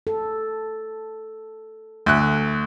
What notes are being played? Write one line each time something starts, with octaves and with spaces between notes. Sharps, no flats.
A4
D2 A3 E5 F#6